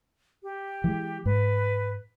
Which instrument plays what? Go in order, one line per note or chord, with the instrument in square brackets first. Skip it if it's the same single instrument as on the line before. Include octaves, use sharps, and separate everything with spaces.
[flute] G4
[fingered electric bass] E3 F#3 G#3
[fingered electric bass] G#2 [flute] B4